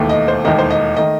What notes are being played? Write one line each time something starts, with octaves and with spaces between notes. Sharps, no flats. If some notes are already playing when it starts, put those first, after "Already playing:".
Already playing: E1 D#2 D#3 A3
D#5
C5
E1 D#2 D#3 A3 D#5
C5
D#5
D#3 A3 D#5